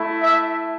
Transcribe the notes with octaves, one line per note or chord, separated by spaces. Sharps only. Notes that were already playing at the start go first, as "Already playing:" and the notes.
Already playing: A3 E4
E5